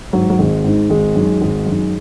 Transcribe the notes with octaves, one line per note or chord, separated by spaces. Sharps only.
G#2 D#3 F#3
F#3
G#1 G#3
G#2 D#3
G#1 G#3
F#2 D#3
G#1
F#2 D#3